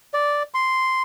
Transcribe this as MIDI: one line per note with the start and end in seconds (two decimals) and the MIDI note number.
0.14 0.43 74
0.54 1.02 84